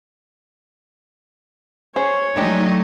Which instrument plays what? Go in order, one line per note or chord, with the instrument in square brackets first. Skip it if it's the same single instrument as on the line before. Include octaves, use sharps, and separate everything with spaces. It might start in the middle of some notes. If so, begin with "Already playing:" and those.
[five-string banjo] C#4 G#4 C5 [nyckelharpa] C#5
[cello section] F#3 A3 D#4 [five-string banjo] G#3 D4 G4